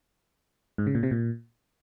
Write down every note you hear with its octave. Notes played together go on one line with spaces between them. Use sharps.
G#2
C#3
A#2
C3
A#2